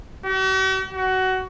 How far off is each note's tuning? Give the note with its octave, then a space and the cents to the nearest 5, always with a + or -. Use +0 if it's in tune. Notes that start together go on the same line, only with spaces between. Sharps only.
F#4 +45
F#4 +20